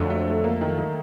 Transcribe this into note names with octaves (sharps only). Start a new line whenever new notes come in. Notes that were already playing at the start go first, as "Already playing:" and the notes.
Already playing: F2 D3 F#3 A3
A3
A3
A#3
D#3
D#3